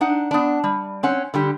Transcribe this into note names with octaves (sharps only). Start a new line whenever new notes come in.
D4 D#4 F#5
B3 D4
G3
C4 C#4 F#5
D3 G3 G4